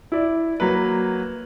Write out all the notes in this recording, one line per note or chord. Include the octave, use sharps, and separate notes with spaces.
E4 D5
F#3 A#3 B4